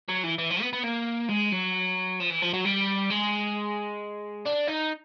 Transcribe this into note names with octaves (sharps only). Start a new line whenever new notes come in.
F#3
E3
E3
F3
B3
B3
A#3
G#3
F#3
F3
E3
F3
F#3
G3
G#3
D4
D#4